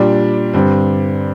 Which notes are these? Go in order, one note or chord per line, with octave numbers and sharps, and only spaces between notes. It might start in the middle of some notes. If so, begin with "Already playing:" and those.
Already playing: A#2 G3 D4
G2 D3 G3 C4